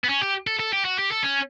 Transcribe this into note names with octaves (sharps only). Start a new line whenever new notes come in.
B3
C#4
G4
A4
A4
G4
F#4
G4
A4
C#4